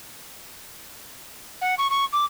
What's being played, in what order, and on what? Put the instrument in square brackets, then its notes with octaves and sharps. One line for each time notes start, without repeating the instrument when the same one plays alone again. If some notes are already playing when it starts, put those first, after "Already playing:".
[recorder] F#5
C#6
C#6
D6